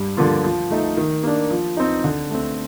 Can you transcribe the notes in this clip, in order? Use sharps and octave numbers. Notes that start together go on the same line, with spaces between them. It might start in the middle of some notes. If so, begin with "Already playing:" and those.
Already playing: G2
D3 F3 A#3 F4
F3
A3 D#4
D#3
A#3 D4
F3
C4 D#4
D3
A3 C4